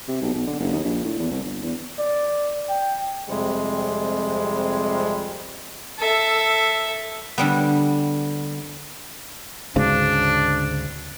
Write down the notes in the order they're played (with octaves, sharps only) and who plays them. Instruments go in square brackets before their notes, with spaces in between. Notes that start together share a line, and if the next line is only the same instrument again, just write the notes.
[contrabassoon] C3
B1
B1
D3
F#1
D#2
A#1
A2
E2
C2
G1
E2
[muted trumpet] D5
G5
[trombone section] F2 C3 G3 G#3
[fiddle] A4 E5
[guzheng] D3 G3 B3
[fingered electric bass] D2 G#2 C#3 [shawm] D4